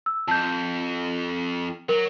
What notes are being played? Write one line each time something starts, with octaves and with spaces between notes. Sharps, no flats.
E6
F2 A5 G6
F#3 A#4